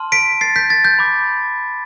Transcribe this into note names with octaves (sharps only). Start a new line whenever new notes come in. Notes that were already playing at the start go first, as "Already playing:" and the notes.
Already playing: A5 C6 F6
B6 D7
A6 C7
G6 B6
A6
G6
B5 D6 G6